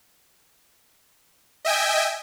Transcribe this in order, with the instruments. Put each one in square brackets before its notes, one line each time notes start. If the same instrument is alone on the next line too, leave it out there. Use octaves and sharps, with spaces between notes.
[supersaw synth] D#5 E5 G5 G#5